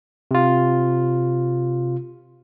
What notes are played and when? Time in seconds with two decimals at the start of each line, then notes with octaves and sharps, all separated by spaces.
0.31 C3 F4